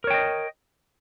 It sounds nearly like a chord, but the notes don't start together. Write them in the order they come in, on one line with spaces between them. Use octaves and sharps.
A#4 C#5 G5 D#5